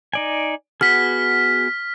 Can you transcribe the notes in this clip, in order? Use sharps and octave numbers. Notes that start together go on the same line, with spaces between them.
D#4 D5 G#5
B3 F#4 G#4 F6 B6